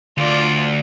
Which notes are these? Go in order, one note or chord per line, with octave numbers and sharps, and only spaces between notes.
D2 F4 D5